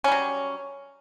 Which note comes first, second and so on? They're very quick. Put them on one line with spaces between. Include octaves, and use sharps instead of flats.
C#4 G3 F#3